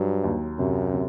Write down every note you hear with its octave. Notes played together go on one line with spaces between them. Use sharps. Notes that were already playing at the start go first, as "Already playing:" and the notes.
Already playing: G2 F#3
D#2
F#2 C3
C3